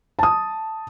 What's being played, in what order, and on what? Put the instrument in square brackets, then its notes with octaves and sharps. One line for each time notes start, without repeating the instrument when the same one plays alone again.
[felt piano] A5 D#6